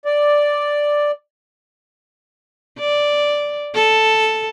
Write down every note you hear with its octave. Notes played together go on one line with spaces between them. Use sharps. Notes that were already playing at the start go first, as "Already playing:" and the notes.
D5
D5
A4